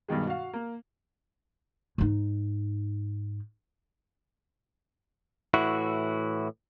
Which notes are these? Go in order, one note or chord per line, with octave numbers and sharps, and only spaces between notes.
G2 B2 D#3 G#3
F#4 F5
A#3
G#2 D#4
A2 E3 E4 F#4